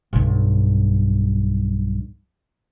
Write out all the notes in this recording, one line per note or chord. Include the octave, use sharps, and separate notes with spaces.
B1 G2